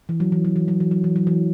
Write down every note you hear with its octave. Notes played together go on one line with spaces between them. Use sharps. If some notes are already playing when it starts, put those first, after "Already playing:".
E3
F#3
E3
F#3
E3
F#3
E3
F#3
E3
F#3
E3